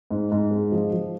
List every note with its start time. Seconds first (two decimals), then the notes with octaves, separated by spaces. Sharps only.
0.11 G#2
0.32 G#2
0.51 G#3
0.72 F3
0.92 F3